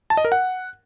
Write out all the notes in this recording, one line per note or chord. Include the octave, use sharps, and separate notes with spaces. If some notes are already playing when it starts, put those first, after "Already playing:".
A5
D#5
A#4
F#5